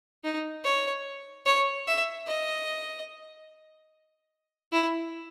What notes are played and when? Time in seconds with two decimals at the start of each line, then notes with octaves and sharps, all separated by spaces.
0.24 D#4
0.64 C#5
1.46 C#5
1.87 E5
2.27 D#5
4.72 E4